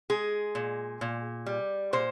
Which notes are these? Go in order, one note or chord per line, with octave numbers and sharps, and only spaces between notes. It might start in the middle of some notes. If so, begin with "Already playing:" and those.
G#3 G#4
A#2
A#2
G3
A#2 C5